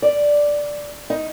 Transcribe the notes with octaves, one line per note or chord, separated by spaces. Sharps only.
D5
D#4